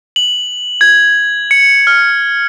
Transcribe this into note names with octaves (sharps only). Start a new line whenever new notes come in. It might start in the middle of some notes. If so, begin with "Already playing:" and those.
F#7
G#6
C#7
F6